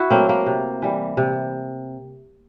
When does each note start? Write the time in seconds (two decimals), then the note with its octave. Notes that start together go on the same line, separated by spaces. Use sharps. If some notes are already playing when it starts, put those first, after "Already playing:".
Already playing: E4 F#4
0.10 F#3 A3 A#3 C4
0.29 A#3
0.46 C3
0.82 E3 G3
1.17 C3